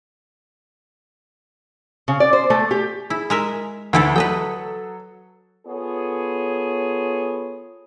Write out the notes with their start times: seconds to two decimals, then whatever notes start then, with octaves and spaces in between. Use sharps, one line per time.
2.08 C#3
2.20 D5
2.33 C5
2.50 A3
2.71 G4
3.10 E4 G#4
3.30 G#3 A#4 E5
3.93 D2 E3 E4 A4
4.16 F#3 A4 B4 D#5 G5 D#6
5.66 B3 F4 G#4 A4 C#5